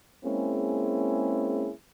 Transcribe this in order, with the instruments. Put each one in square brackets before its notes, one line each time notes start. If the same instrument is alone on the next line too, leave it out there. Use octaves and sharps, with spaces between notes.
[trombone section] G#3 A#3 C4 C#4 E4 G#4